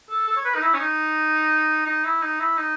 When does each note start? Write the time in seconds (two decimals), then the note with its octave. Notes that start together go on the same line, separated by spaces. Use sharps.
0.10 A4
0.27 A4
0.37 C#5
0.45 B4
0.55 D#4
0.62 E4
0.74 C#4
0.80 D#4
1.86 D#4
2.04 E4
2.22 D#4
2.40 E4
2.57 D#4